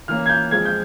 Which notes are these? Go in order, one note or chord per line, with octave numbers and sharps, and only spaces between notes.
E3 A#3 C#4 F6
G#6
G6
F3 G#3 C4 G#6
G6